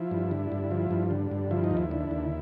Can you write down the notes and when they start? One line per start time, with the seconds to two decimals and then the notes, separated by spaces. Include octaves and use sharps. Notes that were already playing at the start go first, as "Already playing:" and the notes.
Already playing: F3 E4
0.11 G2
0.31 D3
0.52 G2
0.71 F3
0.91 G2
1.11 D3
1.31 G2
1.51 F3 E4
1.64 D#4
1.71 D#2
1.77 E4
1.91 D3
2.11 D#2